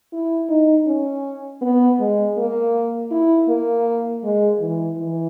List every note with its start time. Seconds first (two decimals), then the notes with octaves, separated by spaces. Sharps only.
0.13 E4
0.49 D#4
0.87 C#4
1.62 B3
2.00 G#3
2.37 A#3
3.11 E4
3.48 A#3
4.24 G#3
4.61 E3
4.98 E3